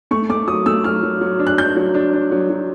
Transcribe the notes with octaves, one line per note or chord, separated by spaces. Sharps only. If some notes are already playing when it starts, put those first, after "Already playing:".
A3 C#6
A3 D6
F#3 D#6
A3 E6
F#3 F6
F#3
F#3
D4
F#6
D4 G6
F#3
D4
D4
F#3
F#3